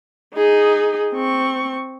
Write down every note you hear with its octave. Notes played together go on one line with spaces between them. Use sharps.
D#4 G#4
C4 C#6